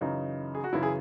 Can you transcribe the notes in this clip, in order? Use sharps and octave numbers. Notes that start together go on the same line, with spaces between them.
F#2 C#3 E3 D#4
G#4
F#4
F#2 C#3 E3 E4
G#4